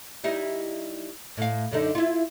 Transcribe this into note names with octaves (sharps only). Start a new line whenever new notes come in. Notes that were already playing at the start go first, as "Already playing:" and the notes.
G3 D#4 E4
A2 F5
F#2 D3 D#4
E4 F4